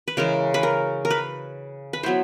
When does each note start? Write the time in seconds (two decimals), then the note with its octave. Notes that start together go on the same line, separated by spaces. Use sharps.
0.08 B4
0.17 C#3 E3 G#3 A#4
0.54 B4
0.63 A#4
1.05 A#4
1.10 B4
1.93 B4
2.03 F#3 B3 E4 C5